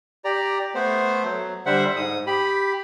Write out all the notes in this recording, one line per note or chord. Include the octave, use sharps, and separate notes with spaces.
G4 D5 A#5
A3 B3 C5
F#3
D3 G3 C5 E5 F#5
G#2 D#6
G4 B5